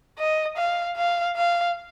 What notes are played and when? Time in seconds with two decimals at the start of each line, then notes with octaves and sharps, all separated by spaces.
0.18 D#5
0.57 F5
0.97 F5
1.36 F5